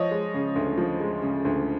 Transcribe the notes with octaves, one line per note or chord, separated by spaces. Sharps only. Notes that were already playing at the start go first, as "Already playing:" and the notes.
Already playing: F3 C#5 D#5
G#3
C#3
D2
F3
G#3
C#3
D2